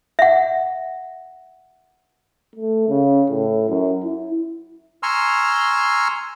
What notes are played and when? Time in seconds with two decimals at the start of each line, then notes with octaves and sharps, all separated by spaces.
0.19 E5 F#5
2.56 A3
2.89 C#3
3.30 A2
3.69 F#2
4.03 E4
5.03 G#5 A#5 C6 C#6 E6 F6